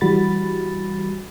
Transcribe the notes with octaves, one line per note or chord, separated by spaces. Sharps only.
E3 G3 F#4 B5 A6